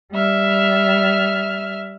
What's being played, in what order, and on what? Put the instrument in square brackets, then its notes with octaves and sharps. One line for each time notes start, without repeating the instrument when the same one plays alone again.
[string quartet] G3 E5 F6